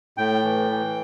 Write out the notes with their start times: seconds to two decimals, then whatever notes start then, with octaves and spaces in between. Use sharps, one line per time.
0.18 A2 G5
0.44 E3
0.70 E3